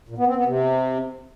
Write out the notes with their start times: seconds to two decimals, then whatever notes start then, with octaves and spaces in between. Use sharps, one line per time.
0.09 A#2
0.18 B3
0.27 C4
0.37 B3
0.46 C3